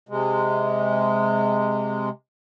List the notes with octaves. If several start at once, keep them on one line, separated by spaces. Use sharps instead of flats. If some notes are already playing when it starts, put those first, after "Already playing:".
C3 G#3